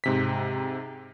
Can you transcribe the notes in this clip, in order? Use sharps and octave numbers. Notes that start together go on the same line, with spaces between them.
G#2 C3 B6